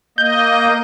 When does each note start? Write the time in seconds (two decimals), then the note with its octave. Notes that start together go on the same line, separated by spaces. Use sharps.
0.18 A#3 D#5 G6